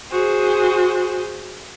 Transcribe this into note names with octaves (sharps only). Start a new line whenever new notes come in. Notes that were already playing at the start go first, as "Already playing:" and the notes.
F#4 G#4 C5